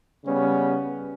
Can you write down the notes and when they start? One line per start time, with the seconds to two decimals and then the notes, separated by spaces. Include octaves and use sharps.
0.24 C#3 G3 B3 C#4